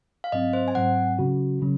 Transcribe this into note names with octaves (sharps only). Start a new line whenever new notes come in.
F5
G#2 F#3 C4 D#5
C5
G#5
G#2 F#3 C4 F#5
C#3 F#3 C#4 F#4
C#3 F#3 C#4